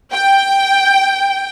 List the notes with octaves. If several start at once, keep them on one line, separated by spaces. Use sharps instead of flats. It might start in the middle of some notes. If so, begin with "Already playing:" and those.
G5